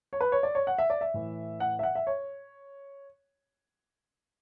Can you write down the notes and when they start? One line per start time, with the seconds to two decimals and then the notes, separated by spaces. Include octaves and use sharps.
0.13 C#5
0.21 B4
0.32 C#5
0.43 D5
0.55 C#5
0.67 F#5
0.78 E5
0.90 D5
1.01 E5
1.14 A2 E3
1.60 F#5
1.79 E5
1.83 F#5
1.95 E5
2.07 C#5